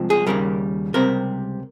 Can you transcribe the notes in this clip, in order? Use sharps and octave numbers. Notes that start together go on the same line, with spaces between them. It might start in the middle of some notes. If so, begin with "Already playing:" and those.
Already playing: C2 C3 F3 G#3
G#4
D#2 C#3 G3 A#4
C#2 C3 G3 C4 A#4